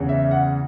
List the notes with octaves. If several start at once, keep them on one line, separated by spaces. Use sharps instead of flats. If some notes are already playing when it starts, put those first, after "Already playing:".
Already playing: E2 C#3 E3
E5
F#5